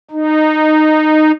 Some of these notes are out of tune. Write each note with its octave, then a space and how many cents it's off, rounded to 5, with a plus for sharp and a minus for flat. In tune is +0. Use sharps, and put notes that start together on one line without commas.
D#4 -15